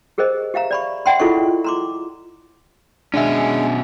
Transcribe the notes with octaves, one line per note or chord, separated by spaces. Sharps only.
G4 G#4 A#4 C5 D#5
G4 E5 F5 A#5
D5 B5 C#6
D5 E5 F#5 G5 B5 C6
E4 F4 G#4 A4 D#5 C#6
A#5 C6 D6
B2 G#3 C#4 D4 E5